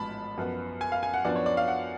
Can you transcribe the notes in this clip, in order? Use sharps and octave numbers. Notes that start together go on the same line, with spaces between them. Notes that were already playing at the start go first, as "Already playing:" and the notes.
Already playing: A1 G#2 F3 B3 A5 B5
F#2 F3 B3
G#5
F5
G#5
F#5
F#2 F3 B3 D4 D5
C#5
D5
F5
F#5